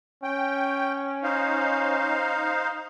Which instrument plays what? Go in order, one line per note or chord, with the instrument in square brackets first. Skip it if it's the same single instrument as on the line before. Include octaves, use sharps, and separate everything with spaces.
[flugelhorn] C#4 [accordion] G5
[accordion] D#4 C5 F5